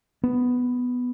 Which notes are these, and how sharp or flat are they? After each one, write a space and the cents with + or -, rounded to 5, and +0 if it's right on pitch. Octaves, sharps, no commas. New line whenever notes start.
B3 +5